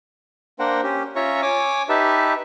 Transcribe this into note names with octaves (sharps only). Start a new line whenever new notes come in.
A#3 D4 A#4 C5 F#5 G5
C#4 G4
C#4 F4 C#5 E5 A#5 C#6
C#5 G#5 D6
D#4 G4 B4 E5 A5